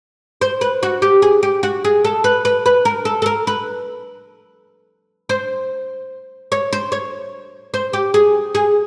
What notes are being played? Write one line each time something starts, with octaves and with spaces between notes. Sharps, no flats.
C5
B4
F#4
G4
G#4
G4
F#4
G#4
A4
B4
B4
B4
A#4
A4
A4
A#4
B4
C5
C#5
C5
C#5
C5
G4
G#4
G#4